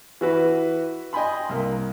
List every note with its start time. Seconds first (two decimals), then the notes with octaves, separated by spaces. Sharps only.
0.21 E3 F#4 B4
1.13 D#5 G5 G#5 B5 C6
1.49 C2 A#3